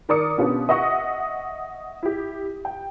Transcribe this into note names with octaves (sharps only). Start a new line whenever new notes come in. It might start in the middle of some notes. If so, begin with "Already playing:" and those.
D#3 A#4 D5 D6 D#6 C#7
B2 B3 C#4 D4 F4 G4
D#5 E5 F#5 C#6 D#6
E4 G4
G5